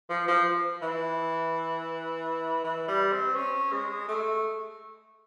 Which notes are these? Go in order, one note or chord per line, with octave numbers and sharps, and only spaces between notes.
F3
F3
E3
E3
G3
C4
C#4
G#3
A3